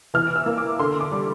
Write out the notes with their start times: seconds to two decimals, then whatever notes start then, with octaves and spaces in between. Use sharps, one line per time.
0.14 E3 F6
0.36 E6
0.46 A#3
0.58 D6
0.79 D3 C6
1.01 D6
1.11 G3